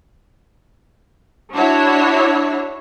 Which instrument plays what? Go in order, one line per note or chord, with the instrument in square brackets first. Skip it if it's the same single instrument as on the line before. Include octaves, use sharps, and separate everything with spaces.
[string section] D4 E4 F#4 C#5